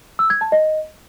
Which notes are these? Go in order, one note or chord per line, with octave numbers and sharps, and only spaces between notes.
E6
G#6
A5
D#5